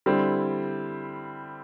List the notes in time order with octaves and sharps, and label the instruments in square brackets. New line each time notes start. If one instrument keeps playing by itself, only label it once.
[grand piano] D3 G3 C4 E4